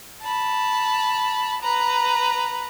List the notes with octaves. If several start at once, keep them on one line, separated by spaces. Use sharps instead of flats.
A5 B5
B4 A#5